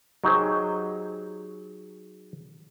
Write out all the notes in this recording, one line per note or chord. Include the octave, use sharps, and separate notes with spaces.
F#3 D#4 G4 G#4 C5